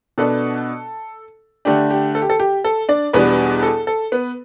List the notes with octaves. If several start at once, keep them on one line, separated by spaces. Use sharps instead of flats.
B2 B3 D4 A4
D3 A3 D4 G4
G4
A4
G4
A4
G4
A4
D4 D5
E2 B2 G3 B3 D4 B4
A4
A4
B3 B4